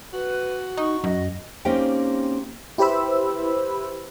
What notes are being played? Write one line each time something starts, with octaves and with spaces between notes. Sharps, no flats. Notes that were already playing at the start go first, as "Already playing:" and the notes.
F#4 B4
D#4 C#6
F#2 D#5
A#3 C4 C#4 D#4 G4 G5
E4 G4 B4 C5 B5 E6